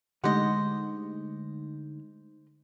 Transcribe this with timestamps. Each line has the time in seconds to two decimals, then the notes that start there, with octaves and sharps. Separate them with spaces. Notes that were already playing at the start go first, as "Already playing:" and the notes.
0.24 D3 G#3 A3 D#4 G4 C5 D#5 F#5